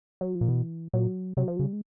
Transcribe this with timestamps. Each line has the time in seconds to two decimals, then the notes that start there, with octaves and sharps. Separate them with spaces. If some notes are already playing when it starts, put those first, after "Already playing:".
0.21 F#3
0.35 F3
0.41 A#2
0.48 B2 E3
0.93 A#2 F#3
1.37 C3 F#3
1.48 F3
1.57 C#3 F#3
1.64 G3
1.73 G#3